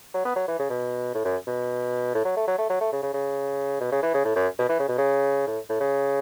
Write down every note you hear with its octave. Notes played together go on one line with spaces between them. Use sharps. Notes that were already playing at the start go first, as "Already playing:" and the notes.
F#3
B3
F#3
E3
C#3
B2
A2
F#2
B2
A2
F#3
A3
F#3
A3
F#3
A3
C#3
C#3
C#3
B2
C#3
E3
C#3
A2
F#2
B2
E3
C#3
B2
C#3
A2
A2
C#3